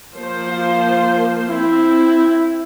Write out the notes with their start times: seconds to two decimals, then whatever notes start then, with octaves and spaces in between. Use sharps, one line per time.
0.14 F3 A#3 C5
0.50 F4
1.50 C4 E4